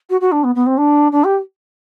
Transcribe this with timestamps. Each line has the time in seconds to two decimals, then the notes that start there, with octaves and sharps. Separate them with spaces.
0.09 F#4
0.20 F#4
0.31 D4
0.43 B3
0.55 B3
0.66 C4
0.77 D4
1.12 D4
1.24 G4